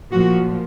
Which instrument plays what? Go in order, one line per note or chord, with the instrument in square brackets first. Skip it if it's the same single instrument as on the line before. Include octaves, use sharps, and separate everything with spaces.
[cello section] A#2 F3 F#4